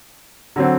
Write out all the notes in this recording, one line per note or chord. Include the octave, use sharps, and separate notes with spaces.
D3 F#3 C4